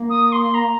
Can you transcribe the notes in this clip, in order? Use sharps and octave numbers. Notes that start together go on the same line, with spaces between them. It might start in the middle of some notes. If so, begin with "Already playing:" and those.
Already playing: A#3
D#6
C6
A#5